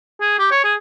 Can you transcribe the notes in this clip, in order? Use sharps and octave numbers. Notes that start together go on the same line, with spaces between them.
G#4
G4
C#5
G#4